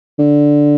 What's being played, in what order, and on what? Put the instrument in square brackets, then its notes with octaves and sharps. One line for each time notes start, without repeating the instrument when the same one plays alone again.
[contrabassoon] D3